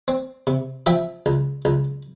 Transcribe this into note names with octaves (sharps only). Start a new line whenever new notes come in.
C4
C3
F3 E5 G5
C#2
C#2